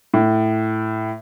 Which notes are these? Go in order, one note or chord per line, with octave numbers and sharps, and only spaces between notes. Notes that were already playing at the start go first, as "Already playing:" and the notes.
A2